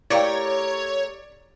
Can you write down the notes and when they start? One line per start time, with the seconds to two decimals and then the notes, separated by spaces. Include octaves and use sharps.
0.10 A3 E4 G4 A#4 C#5 D5 F5 G5